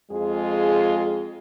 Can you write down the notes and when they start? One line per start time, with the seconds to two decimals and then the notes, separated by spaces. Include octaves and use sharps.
0.11 F2 G#3 F4 G#4